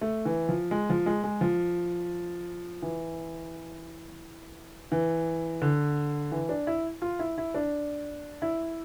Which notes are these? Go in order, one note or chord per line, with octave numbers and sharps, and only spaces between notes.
A3
E3
F3
G#3
F3
G#3
G#3
F3
E3
E3
D3
E3
D4
E4
F4
E4
E4
D4
E4